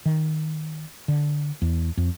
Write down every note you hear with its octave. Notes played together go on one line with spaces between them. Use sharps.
D#3
D3
E2
F2